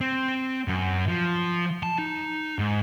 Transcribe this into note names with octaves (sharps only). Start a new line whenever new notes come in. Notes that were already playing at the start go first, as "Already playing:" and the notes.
C4
F#2
F3
A5
D#4
G#2